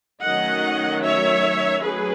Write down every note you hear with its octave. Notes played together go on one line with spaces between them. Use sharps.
D#3 F#3 A3 C#4 D#5 F#5
C#5 E5
F#3 A3 C#4 G#4 B4